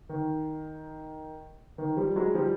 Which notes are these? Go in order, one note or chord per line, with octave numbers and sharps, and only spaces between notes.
D#3
D#3
F3 G3
F#3 G#3
F3 G3